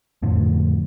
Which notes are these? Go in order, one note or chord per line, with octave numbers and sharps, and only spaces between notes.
F2 A2 D3 F3